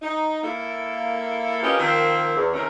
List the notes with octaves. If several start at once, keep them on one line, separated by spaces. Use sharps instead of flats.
D#4
A#3 E4 A4
C#4 F4 G4 A#4 B4 D#5
D#3 F3 A#3 C4
E2
C3 D#3 A3 C4 C#4 A#4